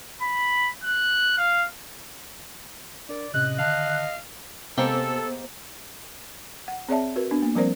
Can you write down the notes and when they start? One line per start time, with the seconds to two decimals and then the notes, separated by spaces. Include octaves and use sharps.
0.22 B5
0.84 F#6
1.38 F5
3.09 D4 A#4 D5
3.34 A2 C3 C#4 D#5 F#6
3.59 D3 D#3 D#5 F5 A5
4.78 C3 G#3 A#3 B3 G4 A4 C5
6.68 F#5
6.89 C4 G#4 C#5 D5 E5 A5
7.16 F#4 A#4 B4
7.31 B3 D4
7.42 A#3
7.55 F3 G3 C4 A#4 C5 D5